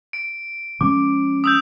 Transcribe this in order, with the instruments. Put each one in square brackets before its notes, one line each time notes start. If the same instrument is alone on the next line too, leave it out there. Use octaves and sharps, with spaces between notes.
[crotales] D7
[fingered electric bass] F3 G#3 C#4 [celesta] D6
[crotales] D#6 E6 G6